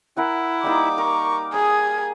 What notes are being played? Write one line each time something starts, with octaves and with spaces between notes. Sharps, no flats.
E4 A#4 F#5 G#5
G3 A#3 D#4 D6
A#4 A#5 C#6
G#4 D#6 G#6